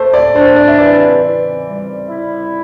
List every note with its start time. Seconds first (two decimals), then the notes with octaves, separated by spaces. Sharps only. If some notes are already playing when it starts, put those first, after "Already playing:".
Already playing: A3 C5
0.14 D5
0.35 D4 C5
0.56 D5
0.68 E5
0.78 E3 D5
1.22 E3
1.65 G3
2.08 E4